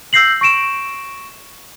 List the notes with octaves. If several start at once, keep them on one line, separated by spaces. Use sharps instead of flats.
E6 G6 A#6 C7 F#7
C#6 A#6 D7 E7